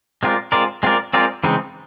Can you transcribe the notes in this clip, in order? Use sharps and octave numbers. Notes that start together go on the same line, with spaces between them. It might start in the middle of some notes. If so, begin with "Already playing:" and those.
G#3 C4 F4 A#4 D5
G#3 C4 F4 A#4 D5
G#3 C4 F4 A#4 D5
G#3 C4 F4 A#4 D5
C#3 E3 G#3 C4 D#4